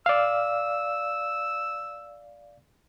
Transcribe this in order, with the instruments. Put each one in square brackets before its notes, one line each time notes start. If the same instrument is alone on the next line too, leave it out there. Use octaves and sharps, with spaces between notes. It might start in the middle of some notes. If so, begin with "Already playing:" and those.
[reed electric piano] D5 F5 [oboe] E6